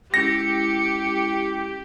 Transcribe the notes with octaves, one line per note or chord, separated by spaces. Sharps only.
G#3 C#4 E4 G4 A#6 C#7